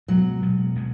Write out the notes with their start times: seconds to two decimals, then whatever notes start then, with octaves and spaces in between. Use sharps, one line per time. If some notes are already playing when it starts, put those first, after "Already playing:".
0.08 B2 F#3 G#3 B3
0.42 B2 G#3 B3
0.75 B2 G#3 B3